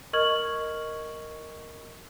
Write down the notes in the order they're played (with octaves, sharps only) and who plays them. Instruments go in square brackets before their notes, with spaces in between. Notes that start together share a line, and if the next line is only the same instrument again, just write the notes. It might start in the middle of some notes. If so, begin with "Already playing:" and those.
[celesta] A#4 D#5 C#6 F6 G#6 F#7